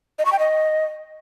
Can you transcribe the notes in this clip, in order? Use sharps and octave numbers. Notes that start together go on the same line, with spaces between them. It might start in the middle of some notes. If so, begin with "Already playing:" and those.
D#5
C#6
G5
D#5